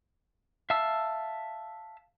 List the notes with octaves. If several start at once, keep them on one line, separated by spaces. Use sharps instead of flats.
E5 F5 A5 E6